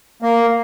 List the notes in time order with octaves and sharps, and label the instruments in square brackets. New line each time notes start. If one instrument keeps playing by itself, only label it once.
[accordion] A#3